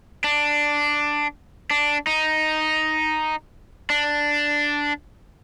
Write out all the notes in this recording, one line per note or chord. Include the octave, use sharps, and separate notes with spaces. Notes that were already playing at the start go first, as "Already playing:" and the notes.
D4
D4
D#4
D4